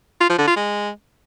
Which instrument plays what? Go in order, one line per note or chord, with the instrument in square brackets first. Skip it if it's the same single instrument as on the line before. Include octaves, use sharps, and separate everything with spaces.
[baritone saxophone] F4
F3
D3
F4
G#3